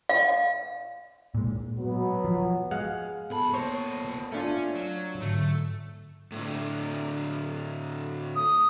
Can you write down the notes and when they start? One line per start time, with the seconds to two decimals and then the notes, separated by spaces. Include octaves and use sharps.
0.09 F5
1.35 A#2 G#3
1.79 B2 F#3 B3
2.25 F3
2.71 G#3 F5 F#5
3.30 B1 B3 A4 A5 B5
3.54 A#2 C5 C#5 D#5
4.32 A3 C#4 D4 F4
4.75 F#3
5.22 G#2 D3 F#3 A3
6.32 A2 D3
8.36 D#6